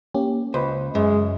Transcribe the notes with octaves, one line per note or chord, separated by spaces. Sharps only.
A#3 C#4 G4
C#2 B4 C5
F#2 G#3